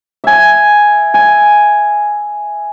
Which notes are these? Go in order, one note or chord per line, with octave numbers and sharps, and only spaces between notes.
E5 G#5
G#5